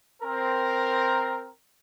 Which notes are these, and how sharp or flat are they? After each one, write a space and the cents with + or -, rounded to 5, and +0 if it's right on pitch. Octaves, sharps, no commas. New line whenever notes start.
C4 +0 A#4 +0